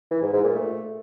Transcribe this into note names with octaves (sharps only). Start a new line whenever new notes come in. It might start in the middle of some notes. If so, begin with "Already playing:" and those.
E3
G#2
G#2
A#2
A3